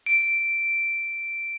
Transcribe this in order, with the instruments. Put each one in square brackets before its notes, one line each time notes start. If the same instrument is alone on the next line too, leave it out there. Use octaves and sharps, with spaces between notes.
[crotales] D7